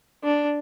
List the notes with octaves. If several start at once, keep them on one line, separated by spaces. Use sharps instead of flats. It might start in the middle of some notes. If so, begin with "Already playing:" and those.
D4